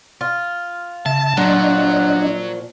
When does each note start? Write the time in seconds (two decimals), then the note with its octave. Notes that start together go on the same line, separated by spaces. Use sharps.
0.21 F4
1.06 C#3 E5 A5 A6
1.37 A#2 F3 F#3 D4 D5 D#5 F#5